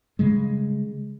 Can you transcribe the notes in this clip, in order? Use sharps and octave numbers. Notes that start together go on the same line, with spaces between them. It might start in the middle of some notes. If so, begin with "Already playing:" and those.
C#3 G3 G#3